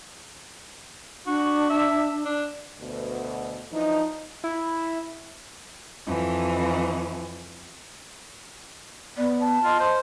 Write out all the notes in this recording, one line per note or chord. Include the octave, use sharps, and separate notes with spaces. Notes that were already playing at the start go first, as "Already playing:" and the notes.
D4 F#4
E5
D4
D2 B2
E3 F3 D4 D#4
E4
F2 E3
B3 D5
A5
F4 D#5
C5